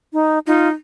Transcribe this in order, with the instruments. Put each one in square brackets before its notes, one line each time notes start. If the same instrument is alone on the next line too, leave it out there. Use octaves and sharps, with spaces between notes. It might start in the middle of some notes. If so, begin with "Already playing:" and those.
[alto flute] D#4
[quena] D#4 [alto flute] F4